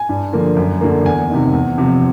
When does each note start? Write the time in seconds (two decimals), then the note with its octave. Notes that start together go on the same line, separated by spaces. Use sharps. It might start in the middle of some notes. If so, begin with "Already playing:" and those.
Already playing: G#5
0.09 G2
0.33 D3 F3 A#3
0.57 F#2
0.81 D3 F#3 A#3
1.05 E2 G#5
1.30 C3 D#3
1.53 E2
1.78 C3 F3